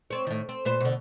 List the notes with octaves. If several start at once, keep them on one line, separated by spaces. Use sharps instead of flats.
C4 C#5
A2 D#3
C4
A#2 B4 C5
B2 D3